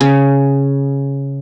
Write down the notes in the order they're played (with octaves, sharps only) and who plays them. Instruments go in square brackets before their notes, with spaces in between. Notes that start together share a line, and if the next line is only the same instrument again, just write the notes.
[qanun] C#3